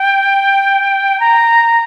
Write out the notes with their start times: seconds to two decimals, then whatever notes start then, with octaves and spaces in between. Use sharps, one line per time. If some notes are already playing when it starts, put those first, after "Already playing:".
Already playing: G5
1.20 A#5